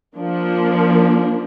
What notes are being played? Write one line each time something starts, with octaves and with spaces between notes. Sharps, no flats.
F3 A#3 D4